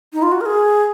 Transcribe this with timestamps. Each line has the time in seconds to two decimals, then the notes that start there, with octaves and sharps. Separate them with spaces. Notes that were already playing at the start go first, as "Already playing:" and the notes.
0.13 D#4
0.22 F4
0.32 F#4
0.41 A#4
0.46 G#4